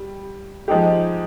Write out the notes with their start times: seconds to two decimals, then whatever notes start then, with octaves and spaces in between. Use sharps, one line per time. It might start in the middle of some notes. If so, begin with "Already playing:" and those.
Already playing: G3
0.68 F3 G#3 D#4 G4